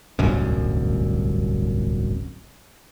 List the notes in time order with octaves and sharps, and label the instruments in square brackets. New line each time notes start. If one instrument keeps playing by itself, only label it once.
[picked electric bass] D1 G1 C2 F#2